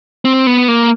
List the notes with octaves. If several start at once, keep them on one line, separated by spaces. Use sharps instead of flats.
C4
B3
A#3